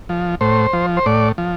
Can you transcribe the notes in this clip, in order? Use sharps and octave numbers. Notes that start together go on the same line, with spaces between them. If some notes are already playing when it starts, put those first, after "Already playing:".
F3
A2 C5
F3
C5
A2 D5
F3